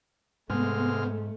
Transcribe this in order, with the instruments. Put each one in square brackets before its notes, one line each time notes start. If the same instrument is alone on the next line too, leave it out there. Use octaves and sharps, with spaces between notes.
[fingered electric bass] G#2 [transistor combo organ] C3 G#3 F6 [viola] A3 [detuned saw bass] B3